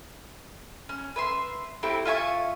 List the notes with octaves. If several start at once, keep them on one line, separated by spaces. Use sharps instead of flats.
C#4
B4 E5 C6
A3 C4 E4 G4
F4 E5 G#5 C#6